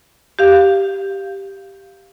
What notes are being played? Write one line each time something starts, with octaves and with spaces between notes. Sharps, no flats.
G4 F5